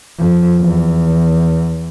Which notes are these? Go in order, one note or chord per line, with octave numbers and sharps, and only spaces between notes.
F2
E2